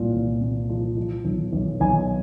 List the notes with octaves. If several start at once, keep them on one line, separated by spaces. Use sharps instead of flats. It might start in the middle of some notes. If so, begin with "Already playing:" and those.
Already playing: C2 A#2 F3
C2
A#2
F3
F3
B1
B1
B1 G#5